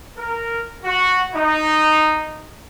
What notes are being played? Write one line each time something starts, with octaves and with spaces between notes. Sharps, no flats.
A#4
F#4
D#4